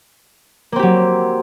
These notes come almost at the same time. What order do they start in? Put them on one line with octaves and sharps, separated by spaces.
A#3 C4 G4 F#3